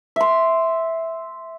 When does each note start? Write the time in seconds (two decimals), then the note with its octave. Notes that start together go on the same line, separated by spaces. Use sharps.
0.16 E5 C6